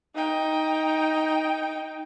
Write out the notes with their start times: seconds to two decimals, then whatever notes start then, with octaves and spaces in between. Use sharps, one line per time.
0.15 D#4 G5